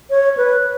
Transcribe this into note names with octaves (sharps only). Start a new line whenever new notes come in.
C#5
B4